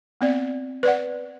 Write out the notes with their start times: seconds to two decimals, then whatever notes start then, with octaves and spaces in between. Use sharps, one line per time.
0.21 B3 C4 D5
0.83 B4 D5 F#5